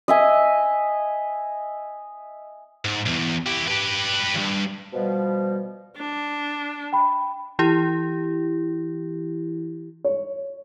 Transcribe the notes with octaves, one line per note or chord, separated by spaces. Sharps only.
D#5 E5 G#5
G#2
B1 E2
E4 G4
G4 B4
E2 G2
B2 F3 G3
D4
G5 B5
E3 E4 G4
C#5